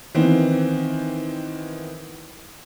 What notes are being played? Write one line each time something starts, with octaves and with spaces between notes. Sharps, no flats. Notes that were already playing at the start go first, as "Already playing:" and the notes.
D#3 E3 B3 C4